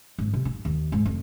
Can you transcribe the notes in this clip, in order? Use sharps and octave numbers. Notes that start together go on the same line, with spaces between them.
G#2
C3
D#4
D#2
G#2
F1